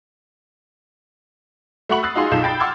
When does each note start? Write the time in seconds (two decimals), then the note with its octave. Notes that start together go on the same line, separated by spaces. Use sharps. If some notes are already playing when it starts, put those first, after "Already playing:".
1.89 A3 F#4 F#5 B5 C#6 F#7
2.03 D#6 E6 F#6 A6 C7
2.15 D#4 F4 F#4 G#4 F5 C6
2.31 B1 D#4 F4 A4 G6 E7
2.44 G5 B5 G6 A6 C7
2.60 F#5 C6 D6 E6 F6 G#6